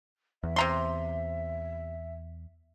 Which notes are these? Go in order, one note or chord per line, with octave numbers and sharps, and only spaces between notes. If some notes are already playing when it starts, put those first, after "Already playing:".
E2 E5
C3 A#5 C6